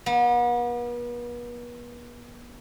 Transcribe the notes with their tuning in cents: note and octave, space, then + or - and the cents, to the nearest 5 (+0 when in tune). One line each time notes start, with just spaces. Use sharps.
B3 -40